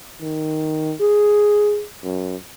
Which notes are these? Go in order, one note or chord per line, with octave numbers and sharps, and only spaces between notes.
D#3
G#4
F#2